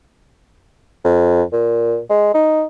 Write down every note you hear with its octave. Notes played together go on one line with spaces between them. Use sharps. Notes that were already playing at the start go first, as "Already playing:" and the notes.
F2
A#2
G#3
D#4